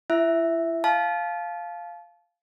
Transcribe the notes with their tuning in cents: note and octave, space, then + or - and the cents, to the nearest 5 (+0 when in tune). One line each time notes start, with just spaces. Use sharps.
E4 +35 E5 +0
F5 +0 A5 -30